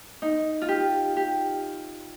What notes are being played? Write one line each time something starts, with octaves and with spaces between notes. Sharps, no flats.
D#4
F4
G4
G4